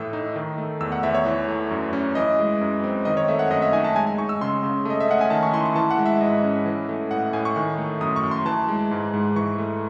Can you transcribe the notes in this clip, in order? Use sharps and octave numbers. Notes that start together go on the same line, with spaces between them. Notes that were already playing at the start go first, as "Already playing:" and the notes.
Already playing: A2 E3 A3 E6
D#4
D#3
A3
E2 E6
F#5
E2 E5
C#5
E3
A3
F#2
C#4
E3 D#5
G#3
F#2
C4
D#3 D#5
C#5
A3 E5
F#5
F#2 D#5
E5
D#4 G#5
A5
G#3 G#5
G#5
D#4 C#6
E6
C#3 C6
C#3
A3 D#5
E5
C#4 F#5
G#5
D#3 A5
C#6
E4 C6
C#6
E3 A5
F#5
G#3
E5
G#2 D#5
C#4
E3
A3
A2 F#5
A2 G#5
C#6
D#3
A3
F#2 D#6
C#6
F#2
C6
E3 A5
G#3
G#2
G#2
E3 C#6
A3